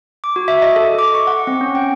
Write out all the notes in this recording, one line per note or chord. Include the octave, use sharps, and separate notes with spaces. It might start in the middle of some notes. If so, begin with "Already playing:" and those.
D6
F#4
E5
D#5
A4
D6
C#6
F#5
C4
C#4
G5